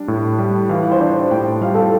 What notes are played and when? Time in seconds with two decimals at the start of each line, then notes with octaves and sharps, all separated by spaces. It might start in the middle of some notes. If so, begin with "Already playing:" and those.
Already playing: G3 D4
0.08 A2
0.38 G3
0.69 E3 F5
0.91 C5
1.00 D4 D5
1.31 A2 G5
1.61 G3 F5
1.75 A4